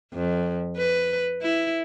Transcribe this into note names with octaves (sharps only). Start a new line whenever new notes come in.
F2
B4
E4